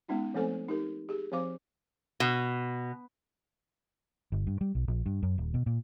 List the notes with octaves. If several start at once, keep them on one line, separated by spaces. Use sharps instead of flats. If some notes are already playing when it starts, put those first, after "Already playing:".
G#3 B3 C#4 D#4 F4
F3 A3 C4 A4 C5 G#5
D#4 G4 A#4
G4 G#4
F3 C4 C5 F5 D6
B2
G1
G2
G3
B1
A#1
G2
F#2
D#1
B2
A#2